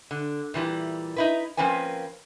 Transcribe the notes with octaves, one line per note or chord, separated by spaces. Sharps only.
D3
A#2 E3 G3
D#4 E4 B4
F3 A#3 C4 C#4 B4 G#5